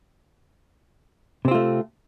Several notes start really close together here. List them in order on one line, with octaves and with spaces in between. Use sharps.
C3 C4 F4 A3